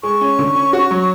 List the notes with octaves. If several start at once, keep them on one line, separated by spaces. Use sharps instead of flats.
G#3 C#6
C#4
D3
C#4
F#4
F#3